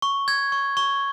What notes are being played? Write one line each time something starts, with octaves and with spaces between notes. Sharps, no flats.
C#6
G#6
C#6
C#6